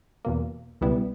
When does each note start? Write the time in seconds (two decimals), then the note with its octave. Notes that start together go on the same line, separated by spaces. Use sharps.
0.25 E2 B2 A#3
0.81 C#2 B2 G3 B3 E4